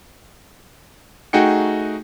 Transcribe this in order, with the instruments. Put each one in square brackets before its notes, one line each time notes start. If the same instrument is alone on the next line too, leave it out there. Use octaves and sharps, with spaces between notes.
[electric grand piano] A3 D#4 F#4 G#4 G5 C#7